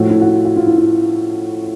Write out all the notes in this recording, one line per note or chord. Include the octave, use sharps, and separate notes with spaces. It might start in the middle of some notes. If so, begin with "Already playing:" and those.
Already playing: A2 F3 A3 F#4
E4
F#4
F4
F#4
F4
E4
F4